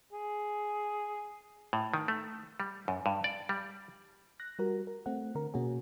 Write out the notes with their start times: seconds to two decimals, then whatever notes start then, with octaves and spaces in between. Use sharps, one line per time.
0.13 G#4
1.73 A2
1.94 D#3
2.08 A3
2.60 G3
2.88 F#2
3.06 G2
3.24 D5
3.49 G3
4.40 F#6 A#6
4.59 G3 F#4 A#4
4.87 A#4
5.06 A3 C4 F#5
5.35 D3 A#4
5.54 B2 A#3 C#4 F#4 G#4